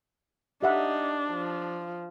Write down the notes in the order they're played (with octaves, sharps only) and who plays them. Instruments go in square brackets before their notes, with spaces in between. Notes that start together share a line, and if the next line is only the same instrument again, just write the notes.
[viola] D4 [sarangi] D#4 [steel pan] G4 E5 F#5
[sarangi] F3